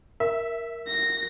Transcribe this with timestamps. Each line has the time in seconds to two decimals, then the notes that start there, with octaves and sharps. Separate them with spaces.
0.20 A#4 E5
0.88 A#6